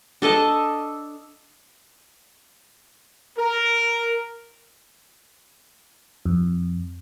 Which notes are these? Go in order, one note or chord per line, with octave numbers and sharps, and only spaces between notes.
D4 A4 D#5 A5
A#4
F2